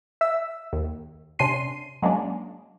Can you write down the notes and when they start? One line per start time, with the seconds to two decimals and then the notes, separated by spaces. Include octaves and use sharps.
0.21 E5 E6
0.73 D#2
1.39 C3 C#4 D4 C6 C7 D#7
2.02 F#3 G#3 A#3 C#4 D4